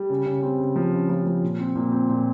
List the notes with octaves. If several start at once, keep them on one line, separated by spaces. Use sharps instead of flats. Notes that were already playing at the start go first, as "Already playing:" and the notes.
Already playing: G3
C#3
C#3
C4
C#3
F3
C#3
F3
F3
A#2
C4
A#2
C4
A#2